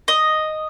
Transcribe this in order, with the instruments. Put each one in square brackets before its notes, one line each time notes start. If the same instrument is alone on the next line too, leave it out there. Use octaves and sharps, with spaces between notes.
[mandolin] D#5